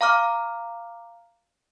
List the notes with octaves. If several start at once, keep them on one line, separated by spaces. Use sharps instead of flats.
F5 A#5 D6 F6